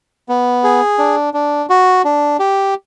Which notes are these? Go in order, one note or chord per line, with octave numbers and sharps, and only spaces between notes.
B3
G#4
D4
D4
F#4
D4
G4